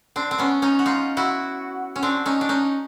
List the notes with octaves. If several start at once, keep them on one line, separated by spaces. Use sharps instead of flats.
C4 D4
C4
B3 C#4
C#4 D#4
F#4
D#4 F4
E4 F#4
C#4
C4 D4
C#4 D#4
D4
C#4 D#4